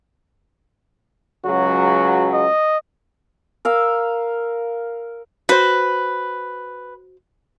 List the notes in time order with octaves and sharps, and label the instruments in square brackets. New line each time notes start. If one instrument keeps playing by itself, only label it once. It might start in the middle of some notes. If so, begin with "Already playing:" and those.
[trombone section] C#2 C#3 F#3 [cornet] F#4
[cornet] D#5
[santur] A#4 F5 E6
[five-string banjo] F#4 C5 [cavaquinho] B4